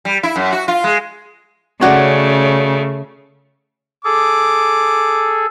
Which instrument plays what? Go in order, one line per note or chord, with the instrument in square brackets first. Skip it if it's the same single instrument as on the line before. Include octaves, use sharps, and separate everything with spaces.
[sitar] G3
E4
F#2
F#4
F4
G#3
[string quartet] C#3 A3 [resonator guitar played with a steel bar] C#4 F#4 D5
[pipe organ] G#4 A4 [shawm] D6